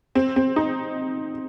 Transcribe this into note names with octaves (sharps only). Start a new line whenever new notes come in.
C4
C4
D#4